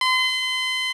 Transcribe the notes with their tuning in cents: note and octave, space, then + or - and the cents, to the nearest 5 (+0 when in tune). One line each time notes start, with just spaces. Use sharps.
C6 -35